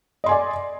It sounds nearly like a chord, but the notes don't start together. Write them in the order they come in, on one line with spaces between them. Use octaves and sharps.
D#5 C6 G#5 D5